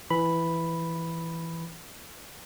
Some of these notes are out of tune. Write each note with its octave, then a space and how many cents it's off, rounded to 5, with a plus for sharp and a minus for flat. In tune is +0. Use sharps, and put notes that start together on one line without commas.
E3 +5 B5 +0